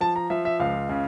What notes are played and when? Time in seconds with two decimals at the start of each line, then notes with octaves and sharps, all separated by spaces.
0.01 F3 A5
0.16 A#5
0.30 F3 E5
0.45 E5
0.60 C#2 F5
0.89 C#3